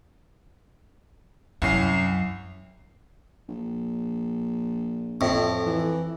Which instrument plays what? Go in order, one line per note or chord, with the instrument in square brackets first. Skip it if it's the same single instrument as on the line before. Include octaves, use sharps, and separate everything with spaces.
[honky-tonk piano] C2 C#4 C7 [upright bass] F#2
[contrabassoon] A#1
[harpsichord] F2 A2
[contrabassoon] E3